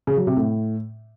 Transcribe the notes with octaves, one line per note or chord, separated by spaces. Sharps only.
C#3
F#3
C3
A2